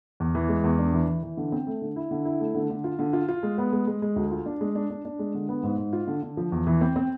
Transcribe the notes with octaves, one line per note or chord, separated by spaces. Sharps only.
E2
E3
G#3
E2
D4
E3
E3
E3
D3
C4
A3
D3
E4
D3
E4
A3
D3
D3
F4
D3
F4
F4
G#3
B3
G#3
G#3
G#3
D2
F4
D4
G#3
D4
D4
D4
G#3
D3
B3
G#2
G#2
F4
D3
D3
F3
E2
E3
C4
C4